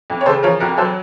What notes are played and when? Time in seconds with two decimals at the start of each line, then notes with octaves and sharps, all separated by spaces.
0.10 F2
0.21 C#5
0.26 C#3 A4 C5
0.43 F3 A#4 C#5
0.60 F2 F#4 A#4
0.77 F#3 A4 C5